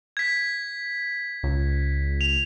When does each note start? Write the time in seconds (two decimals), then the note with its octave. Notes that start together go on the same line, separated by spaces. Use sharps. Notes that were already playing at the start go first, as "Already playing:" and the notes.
0.17 G#6 B6
1.43 C#2
2.21 F7